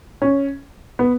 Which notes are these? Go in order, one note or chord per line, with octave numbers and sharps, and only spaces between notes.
C#4
B3